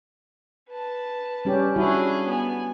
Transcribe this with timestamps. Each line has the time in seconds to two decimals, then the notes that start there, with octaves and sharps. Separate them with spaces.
0.70 B4 A5
1.45 G3 C#4 G4
1.76 G3 C#4 D4 E4 F#4 G#4
2.26 B3 G#5